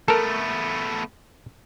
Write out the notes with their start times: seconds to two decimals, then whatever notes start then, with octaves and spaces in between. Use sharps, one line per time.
0.08 A3 B3 A4 A#4